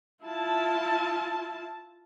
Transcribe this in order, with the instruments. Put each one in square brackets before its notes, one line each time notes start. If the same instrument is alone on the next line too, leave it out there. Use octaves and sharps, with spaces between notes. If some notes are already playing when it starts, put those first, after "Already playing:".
[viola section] E4 F4 A5